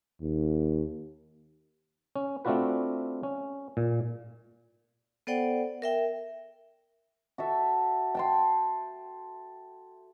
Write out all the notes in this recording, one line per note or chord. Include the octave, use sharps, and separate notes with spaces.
D#2
C#4
A3 C4 D4 F4 F#4 B4
C#4
A#2
B3 A4 C5 D5 F#5 G5
A#4 E5 G5
F#4 A4 E5
G5 A5 C6